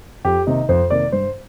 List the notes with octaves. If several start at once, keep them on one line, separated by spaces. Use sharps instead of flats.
F2 G4
C3 D#3 A#3 D#4
F2 C5
C3 D#3 A#3 D5
G2 C5